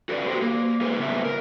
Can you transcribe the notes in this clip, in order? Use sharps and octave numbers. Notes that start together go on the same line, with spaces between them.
F#4 A4 B4 C5 D5
F#4 G4 C5
A#3
G#3 F4 G#4 B4 C5
A2 C#3 B3 C#5 E5
A#4